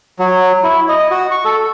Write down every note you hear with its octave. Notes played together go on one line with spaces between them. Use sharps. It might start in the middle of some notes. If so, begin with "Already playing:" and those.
F#3
E4
D#5
F#4
C#6
A4